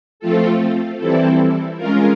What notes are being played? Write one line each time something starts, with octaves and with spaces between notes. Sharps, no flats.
F3 A3 C4 F4 A4
E3 G3 C4 E4 A4
G#3 C#4 F4 A#4